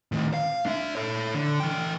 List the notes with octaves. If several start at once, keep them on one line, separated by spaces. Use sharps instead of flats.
A2 D#3
F5
D4 E5
A4 C#5
D3
E3 G5